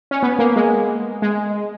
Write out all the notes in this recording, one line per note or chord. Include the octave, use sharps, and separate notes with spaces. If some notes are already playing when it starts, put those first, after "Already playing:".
C#4
B3
A#3
G#3
G#3